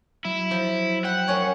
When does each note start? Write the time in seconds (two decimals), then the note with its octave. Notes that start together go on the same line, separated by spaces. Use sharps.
0.25 F#3 E4
0.51 F3
1.05 F#5 G5
1.28 F#2 C#4 C#5